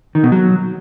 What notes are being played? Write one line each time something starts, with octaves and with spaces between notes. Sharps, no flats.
D#3
B2
F#3